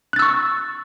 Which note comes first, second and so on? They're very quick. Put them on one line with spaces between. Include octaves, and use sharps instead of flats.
F#6 A6 E6 C#6